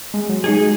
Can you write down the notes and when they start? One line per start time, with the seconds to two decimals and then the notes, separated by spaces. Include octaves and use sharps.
0.14 G#3
0.29 F#3
0.44 G#3 D#4 G#4